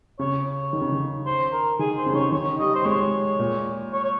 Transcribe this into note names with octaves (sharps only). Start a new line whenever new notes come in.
C#3 C#5
C#5
D#3
C#3
D#3
C5
A#4
D#3 G#4
C5
C#3
D#3 C#5
C#3
D#3 C#5
G3 D#5
C5
G#3 C#5
A#2
C#5
C#5